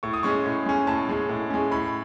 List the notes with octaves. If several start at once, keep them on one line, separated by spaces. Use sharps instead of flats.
A2 C#6
D#6
G#3 C#4 C#6
A2
G#3 C#4
A2 A5
G#3 C#4
A2
G#3 C#4
A2 B5